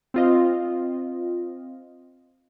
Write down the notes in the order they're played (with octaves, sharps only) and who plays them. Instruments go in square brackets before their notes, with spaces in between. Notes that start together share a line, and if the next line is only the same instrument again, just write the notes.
[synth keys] C4 F4 D#5